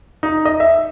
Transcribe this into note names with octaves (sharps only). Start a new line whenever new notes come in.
D#4
D#5
E5